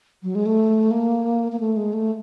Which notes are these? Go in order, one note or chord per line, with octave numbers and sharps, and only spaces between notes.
F#3
G#3
A3
A#3
A#3
A3
G#3
A3